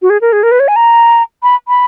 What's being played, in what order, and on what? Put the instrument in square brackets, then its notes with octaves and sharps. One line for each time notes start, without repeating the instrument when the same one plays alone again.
[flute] F#4
G#4
A#4
G#4
A#4
B4
C#5
G#5
A#5
B5
B5